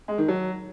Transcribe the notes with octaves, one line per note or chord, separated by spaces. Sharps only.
G#3
D#3
F#3